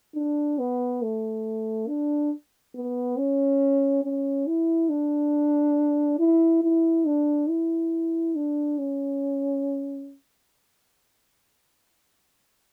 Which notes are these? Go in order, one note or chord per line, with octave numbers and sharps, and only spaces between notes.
D4
B3
A3
D4
B3
C#4
C#4
E4
D4
E4
E4
D4
E4
D4
C#4